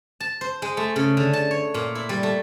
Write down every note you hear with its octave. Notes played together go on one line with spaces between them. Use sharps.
A5
C5
G#3
A3
C#3
D3
A5
C#5
A#2
E4
G3
A3